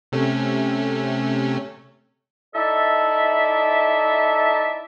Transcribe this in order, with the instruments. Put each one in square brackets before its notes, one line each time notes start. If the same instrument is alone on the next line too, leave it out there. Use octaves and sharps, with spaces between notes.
[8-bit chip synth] C3 A3 C#4
[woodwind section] D#4 E4 A4 D5 E5 A5